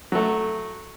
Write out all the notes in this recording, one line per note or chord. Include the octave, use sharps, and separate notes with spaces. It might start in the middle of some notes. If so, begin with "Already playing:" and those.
F#3 A3